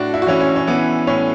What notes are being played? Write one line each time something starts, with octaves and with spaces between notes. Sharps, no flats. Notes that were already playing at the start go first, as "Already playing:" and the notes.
Already playing: A2 D4 F#4
E4
F#4
E3 C#4 E4
C#4
C#4
E3 B3
A2 C#4